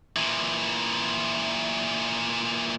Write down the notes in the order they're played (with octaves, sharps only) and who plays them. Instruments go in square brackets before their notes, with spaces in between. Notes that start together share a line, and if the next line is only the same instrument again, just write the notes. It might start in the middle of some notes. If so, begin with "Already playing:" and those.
[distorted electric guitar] A#2 E3